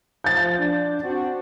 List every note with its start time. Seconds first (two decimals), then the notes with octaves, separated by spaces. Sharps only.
0.24 F3 G6 A6
0.58 D4
1.03 C4 D4 F#4